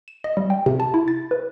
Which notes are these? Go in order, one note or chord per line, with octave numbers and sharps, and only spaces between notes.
E7
D#5
G3
G5
C3
A5
E4
A6
B4